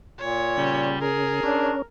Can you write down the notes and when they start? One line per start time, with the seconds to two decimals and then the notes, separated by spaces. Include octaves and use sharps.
0.19 A#2 C#5
0.57 C#3 G3
1.01 G#4 A#4
1.43 C#4 D4